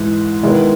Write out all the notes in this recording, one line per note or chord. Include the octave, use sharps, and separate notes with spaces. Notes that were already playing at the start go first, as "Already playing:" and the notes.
Already playing: G#2 E3 G#3
D#3 G#3 B3 E4